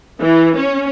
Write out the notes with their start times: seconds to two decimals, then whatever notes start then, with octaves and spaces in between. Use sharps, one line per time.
0.20 E3
0.56 C#4